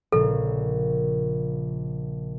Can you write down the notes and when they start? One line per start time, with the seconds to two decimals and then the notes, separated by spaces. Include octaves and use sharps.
0.12 A#1 A#2 C#3 A4